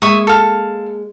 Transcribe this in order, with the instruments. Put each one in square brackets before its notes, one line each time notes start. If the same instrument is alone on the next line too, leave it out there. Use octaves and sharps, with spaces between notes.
[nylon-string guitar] G#3 A#3 [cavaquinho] E5 C#6 D#6
[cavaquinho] A4 F5